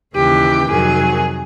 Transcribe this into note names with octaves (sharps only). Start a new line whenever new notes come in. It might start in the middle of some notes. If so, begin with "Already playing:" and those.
D#2 C#3 E3 G4
F2 C3 D#3 F#3 G#4